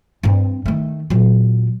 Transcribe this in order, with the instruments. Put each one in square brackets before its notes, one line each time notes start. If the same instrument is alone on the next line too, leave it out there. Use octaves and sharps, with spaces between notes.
[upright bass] G2 C4
D#3 A3
A#2 F#3